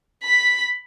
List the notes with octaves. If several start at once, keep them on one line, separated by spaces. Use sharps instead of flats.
B5 B6